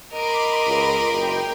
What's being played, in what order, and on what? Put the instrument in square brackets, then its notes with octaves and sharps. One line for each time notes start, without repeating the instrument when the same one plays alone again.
[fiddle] A#4 [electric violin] D#5 D7 [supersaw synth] B5 C6 D6
[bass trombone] C#2
[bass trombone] F#1 [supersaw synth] G5